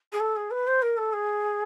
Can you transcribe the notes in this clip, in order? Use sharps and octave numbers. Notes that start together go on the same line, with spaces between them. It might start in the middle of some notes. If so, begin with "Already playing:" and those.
G#4
A4
G#4
B4
C5
A#4
A4
G#4